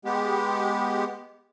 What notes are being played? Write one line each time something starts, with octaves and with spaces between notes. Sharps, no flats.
G#3 B3 G4